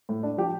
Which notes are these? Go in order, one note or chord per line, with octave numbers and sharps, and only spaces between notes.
A2
D4
F3 G4